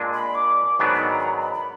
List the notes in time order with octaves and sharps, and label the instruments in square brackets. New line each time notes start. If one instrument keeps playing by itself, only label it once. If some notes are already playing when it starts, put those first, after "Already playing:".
Already playing: [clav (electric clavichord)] A#2 G#3 D4 G#4
[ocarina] B5
D6
[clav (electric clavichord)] G#2 D#3 F#3 B3 D4 [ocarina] B5
[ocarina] B5
A#5
B5
A#5
B5
B5